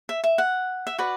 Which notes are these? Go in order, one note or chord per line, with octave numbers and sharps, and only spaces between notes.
E5
E5
F#5
E5
F#4 B4 D5 F#5